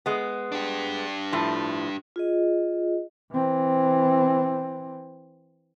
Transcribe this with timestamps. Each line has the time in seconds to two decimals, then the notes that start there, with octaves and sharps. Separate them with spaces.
0.06 G#3 B3
0.52 D4 G4
1.32 A2 F3
2.16 F4 G#4 D#5
3.32 E3 C4